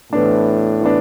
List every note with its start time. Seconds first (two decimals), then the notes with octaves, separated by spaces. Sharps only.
0.12 A2 E3 B3 D4
0.81 E3 B3 D4